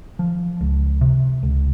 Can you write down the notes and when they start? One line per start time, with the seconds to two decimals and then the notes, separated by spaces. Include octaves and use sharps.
0.19 F3
0.61 C#2
1.01 C3
1.43 C#2